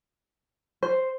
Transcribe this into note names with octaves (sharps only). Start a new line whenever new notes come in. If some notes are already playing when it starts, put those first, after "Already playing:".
C5